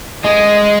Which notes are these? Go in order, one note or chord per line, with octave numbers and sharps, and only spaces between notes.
G#3 D#5